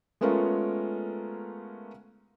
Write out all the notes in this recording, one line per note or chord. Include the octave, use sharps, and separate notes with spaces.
G#3 A3 B3 C#4 F4 A#4